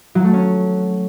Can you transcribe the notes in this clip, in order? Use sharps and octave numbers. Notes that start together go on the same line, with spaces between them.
F#3
A3
C#4